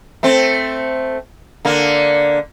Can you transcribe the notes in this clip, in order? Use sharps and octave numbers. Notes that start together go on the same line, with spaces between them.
A3 C4
D3 A#3